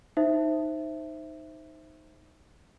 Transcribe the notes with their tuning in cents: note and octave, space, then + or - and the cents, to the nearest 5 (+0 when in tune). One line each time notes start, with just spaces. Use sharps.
D#4 +0 C5 +0 E5 +0